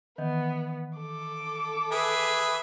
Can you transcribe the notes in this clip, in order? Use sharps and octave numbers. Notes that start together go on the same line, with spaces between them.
D#3 E3 B3
A4 D6
G#4 B4 E5